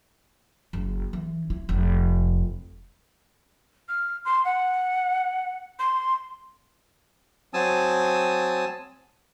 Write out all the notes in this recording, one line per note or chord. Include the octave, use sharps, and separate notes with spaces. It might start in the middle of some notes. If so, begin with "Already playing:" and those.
F#1
E3
E4
F1
F6
C6
F#5
C6
F#3 C4 G#5 A5 D#6 E6